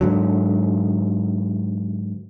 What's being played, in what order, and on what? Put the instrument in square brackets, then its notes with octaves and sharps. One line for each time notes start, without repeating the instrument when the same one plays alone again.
[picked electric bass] G#2 D3 F#3